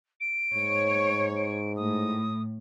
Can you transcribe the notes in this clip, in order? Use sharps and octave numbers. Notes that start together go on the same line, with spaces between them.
D7
G#2 C#5
D7
A2 D#6